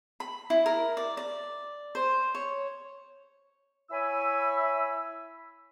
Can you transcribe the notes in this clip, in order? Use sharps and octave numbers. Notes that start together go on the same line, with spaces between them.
B5
E4
A#4
D5
D5
C5
C#5
E4 C#5 G#5 B5 E6